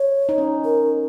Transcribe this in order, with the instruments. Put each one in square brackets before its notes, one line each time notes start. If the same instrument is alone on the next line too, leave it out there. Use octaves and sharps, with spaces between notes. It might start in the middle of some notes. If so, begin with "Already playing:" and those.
Already playing: [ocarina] C#5
[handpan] D#4
C#4
[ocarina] A#4